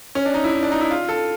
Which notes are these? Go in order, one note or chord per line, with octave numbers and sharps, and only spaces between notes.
C#4
D4
D#4
E4
D#4
D4
D#4
E4
F4
A4